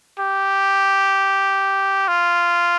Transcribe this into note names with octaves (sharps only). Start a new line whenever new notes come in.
G4
F4